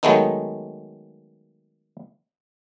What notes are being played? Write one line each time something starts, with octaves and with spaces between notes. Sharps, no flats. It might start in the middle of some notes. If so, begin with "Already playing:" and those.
D#3 F#3 G#3 A3 B3 D#4